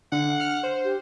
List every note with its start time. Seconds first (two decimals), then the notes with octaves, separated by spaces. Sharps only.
0.12 D3 D4 F#5
0.40 F6
0.63 C5
0.84 G4